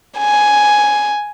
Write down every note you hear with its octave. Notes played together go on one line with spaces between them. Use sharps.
G#5